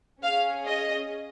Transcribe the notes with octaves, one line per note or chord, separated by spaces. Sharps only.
C#4 G#4 F5
D#5